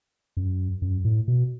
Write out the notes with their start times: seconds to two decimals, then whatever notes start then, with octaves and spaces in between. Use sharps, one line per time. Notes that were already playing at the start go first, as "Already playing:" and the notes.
0.37 F#2
0.82 F#2
1.05 A2
1.28 B2